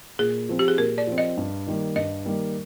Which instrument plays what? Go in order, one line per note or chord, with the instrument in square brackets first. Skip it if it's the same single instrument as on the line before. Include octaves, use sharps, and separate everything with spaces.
[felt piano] A#2 [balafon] G#4
[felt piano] F3 C4
[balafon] G4
G#4
[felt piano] A#2 [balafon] A#4
[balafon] D5
[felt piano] F3 C4
[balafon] D#5
[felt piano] G2
D#3 G3 A#3
[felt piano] G2 [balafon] D#5
[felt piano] D#3 G3 A#3